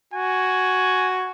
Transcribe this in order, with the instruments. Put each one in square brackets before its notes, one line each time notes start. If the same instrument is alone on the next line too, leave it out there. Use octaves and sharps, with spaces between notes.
[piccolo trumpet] F#4 [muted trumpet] G#5